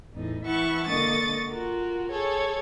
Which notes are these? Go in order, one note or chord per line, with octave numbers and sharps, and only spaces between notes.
E2 A2 D#4
E3 E4 E5 F#5 A5 C#6
D3 A#3 D#5 C#6 D#6 A6
F4 F#4 A#4
G#4 A4 C#5